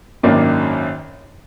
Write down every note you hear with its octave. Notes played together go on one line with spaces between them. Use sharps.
G#1 F#2 D#3 A#3 D4